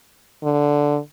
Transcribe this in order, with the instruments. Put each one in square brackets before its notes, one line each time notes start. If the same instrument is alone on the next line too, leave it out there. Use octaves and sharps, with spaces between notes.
[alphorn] D3